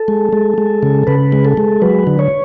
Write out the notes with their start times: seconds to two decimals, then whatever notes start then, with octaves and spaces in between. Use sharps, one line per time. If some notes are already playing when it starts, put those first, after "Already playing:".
Already playing: A4
0.08 G#3
0.33 G#3
0.58 G#3
0.83 C#3
1.07 C#3 B4
1.32 G#3
1.45 A4
1.57 G#3
1.82 F#3 B4
2.07 D3
2.19 C#5